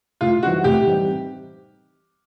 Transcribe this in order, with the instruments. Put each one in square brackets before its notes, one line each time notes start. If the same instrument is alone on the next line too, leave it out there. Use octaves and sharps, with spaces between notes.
[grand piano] A2 [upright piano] F4
[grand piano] E3 G3 C4 D#4 [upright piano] F#4
[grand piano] A2 [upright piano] G4
[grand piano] E3 G3 C4 D#4